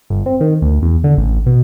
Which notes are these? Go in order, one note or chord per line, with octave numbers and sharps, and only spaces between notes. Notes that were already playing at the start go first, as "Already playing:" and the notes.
G1
C4
D#3
D2
E2
D3
A1
B2